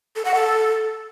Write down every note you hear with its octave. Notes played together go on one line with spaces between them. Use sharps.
A4
F#5
A4